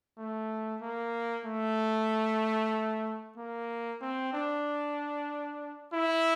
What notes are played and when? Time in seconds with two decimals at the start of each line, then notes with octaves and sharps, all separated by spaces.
0.18 A3
0.81 A#3
1.46 A3
3.37 A#3
4.01 C4
4.33 D4
5.93 E4